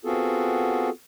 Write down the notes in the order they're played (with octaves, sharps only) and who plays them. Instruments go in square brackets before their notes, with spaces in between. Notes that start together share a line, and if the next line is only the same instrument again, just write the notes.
[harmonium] B3 C4 F4 F#4 G#4 A4